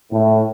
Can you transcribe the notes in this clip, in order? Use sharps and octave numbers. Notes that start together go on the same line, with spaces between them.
A2